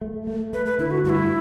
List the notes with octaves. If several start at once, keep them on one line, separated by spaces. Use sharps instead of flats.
A3
A3
A3 B4
B4
D3 E4
F#4
G2 E4 F#4